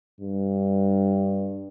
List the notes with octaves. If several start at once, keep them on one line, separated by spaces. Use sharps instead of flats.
G2